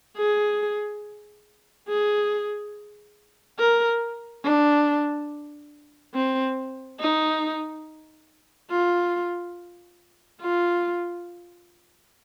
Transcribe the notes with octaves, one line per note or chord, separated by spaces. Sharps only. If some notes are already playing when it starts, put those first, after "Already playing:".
G#4
G#4
A#4
D4
C4
D#4
F4
F4